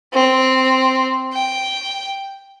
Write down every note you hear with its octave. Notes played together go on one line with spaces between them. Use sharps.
C4
G5